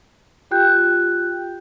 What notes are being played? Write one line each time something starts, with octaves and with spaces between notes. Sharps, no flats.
F4 G4 G5 F#6 G6